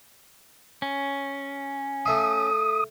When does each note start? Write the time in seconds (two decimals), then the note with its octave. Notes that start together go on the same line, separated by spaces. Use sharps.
0.82 C#4
2.05 A3 E5 F5 D#6